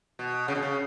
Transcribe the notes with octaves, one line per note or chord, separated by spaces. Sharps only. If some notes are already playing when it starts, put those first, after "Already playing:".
B2
C#3
B2
C#3